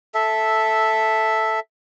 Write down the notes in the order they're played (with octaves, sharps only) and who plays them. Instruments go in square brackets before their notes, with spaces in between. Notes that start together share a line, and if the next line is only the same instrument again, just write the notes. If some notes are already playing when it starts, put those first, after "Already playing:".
[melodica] A4 E5